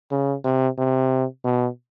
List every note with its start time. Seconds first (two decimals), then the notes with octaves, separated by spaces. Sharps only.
0.11 C#3
0.44 C3
0.78 C3
1.44 B2